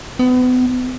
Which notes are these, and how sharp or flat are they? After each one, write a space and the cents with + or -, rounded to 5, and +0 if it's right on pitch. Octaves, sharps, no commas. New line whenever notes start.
B3 +35